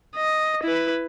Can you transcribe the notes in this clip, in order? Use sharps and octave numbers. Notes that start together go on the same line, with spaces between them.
D#5
E4 B4